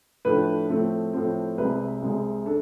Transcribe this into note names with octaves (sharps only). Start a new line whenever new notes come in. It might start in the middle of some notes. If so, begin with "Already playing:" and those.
A2 F3 A3 D4 B4
A2 F3 A3 C4
A2 F3 A3 C4
C2 C3 G#3 C4 B4
C2 C3 G#3 C4
D4 A4